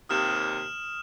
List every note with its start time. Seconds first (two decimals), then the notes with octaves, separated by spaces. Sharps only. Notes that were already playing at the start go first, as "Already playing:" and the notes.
0.09 D#2 C3 D#6 F6 E7